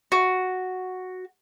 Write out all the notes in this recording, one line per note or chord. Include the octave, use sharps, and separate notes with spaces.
F#4